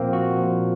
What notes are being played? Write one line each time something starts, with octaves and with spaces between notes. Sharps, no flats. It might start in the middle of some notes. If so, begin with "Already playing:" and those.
Already playing: A#2 F3 A#3 C4
F#4
A#2 F3